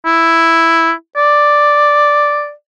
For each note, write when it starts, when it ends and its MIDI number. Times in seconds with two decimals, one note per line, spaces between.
0.06 0.91 64
1.17 2.51 74